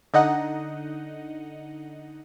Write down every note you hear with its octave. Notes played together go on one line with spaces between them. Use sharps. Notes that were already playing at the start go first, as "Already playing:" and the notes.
D3 D#4 D#5 F#5